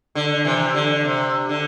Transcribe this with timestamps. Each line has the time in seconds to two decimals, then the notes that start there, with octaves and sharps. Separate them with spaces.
0.15 D3
0.45 C3 E3
0.75 D3
1.04 C3
1.49 D3